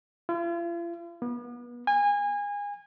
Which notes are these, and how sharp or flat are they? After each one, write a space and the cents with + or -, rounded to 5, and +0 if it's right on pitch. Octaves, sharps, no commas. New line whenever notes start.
F4 -45
B3 -35
G#5 -25